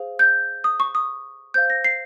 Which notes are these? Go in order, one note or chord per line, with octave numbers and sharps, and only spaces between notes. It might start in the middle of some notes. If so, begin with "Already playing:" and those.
Already playing: G#4 C5 F5
G6
D#6
C#6
D#6
C5 F5 G6
A#6
C7